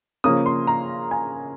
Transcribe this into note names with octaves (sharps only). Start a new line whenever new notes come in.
C#3 F3 A#3 C#4 D#6
C6
A#5
G#5